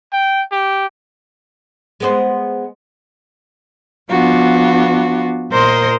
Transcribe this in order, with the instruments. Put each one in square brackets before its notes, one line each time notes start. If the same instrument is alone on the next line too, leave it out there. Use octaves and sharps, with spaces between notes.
[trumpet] G5
G4
[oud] G#3 B3 C5
[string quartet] F3 B3 D4 F4 F#4
A#2 A#4 C5 D#5 C6